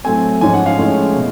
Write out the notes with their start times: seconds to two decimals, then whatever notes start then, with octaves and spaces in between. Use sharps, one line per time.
0.04 A2 F#3 A3 C4 G#5
0.41 G#2 F3 G#3 C#4 G#5
0.54 F#5
0.66 F5
0.79 A2 F3 G#3 C#4
1.16 B2